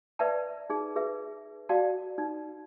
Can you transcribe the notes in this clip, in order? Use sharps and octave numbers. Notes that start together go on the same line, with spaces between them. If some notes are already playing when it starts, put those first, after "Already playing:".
B4 D5 E5 G5 A5
D#4 G#4
G#4 B4 E5
F#4 D5 F5 G5 A5
D#4